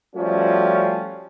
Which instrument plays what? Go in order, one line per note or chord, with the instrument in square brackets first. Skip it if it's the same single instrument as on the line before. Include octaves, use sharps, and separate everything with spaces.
[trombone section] F3 G3 A3 C#4 F4 F#4